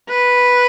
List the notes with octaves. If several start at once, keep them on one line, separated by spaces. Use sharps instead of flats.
B4